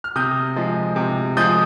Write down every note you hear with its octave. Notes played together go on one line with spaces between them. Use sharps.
F6
C3 D#6 G6
F3 G#3
C3
F3 G#3 D#6 G6